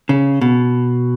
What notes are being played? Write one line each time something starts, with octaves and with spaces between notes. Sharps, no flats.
C#3
B2